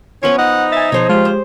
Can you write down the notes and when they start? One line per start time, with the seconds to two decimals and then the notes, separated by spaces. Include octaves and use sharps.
0.23 F3 B3 C#4 C#5
0.38 D#4 F#5
0.72 E5 G#5 A6
0.92 B2 F3 G#4 C5 C#5
1.09 G#3 F4 G4
1.25 C5